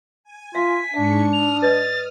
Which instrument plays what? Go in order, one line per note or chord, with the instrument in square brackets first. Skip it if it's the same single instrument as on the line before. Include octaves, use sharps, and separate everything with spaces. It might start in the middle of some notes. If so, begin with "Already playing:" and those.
[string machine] G#5
[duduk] F4 [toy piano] E5 [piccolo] B6
[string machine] G#2 C#6 C#7 [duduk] D4 [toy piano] E5
[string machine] D#6 F6 [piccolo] F7
[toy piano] B4 D5 D#5 [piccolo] A6